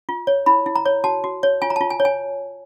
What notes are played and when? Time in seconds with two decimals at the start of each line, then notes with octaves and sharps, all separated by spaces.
0.09 F4
0.27 C#5
0.46 E4 B5
0.66 E4
0.76 A#5
0.86 C#5
1.04 F#4 A5
1.24 F#4
1.43 C#5
1.62 F4 G#5
1.70 A#5
1.76 F4 A5
1.90 G#5
2.00 C#5
2.05 G#5